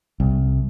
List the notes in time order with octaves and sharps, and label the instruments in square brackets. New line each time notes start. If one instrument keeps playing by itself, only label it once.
[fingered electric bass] C2